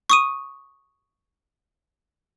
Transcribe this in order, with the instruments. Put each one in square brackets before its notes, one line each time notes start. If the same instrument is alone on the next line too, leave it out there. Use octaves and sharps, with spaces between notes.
[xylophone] C#6 D#6 D#7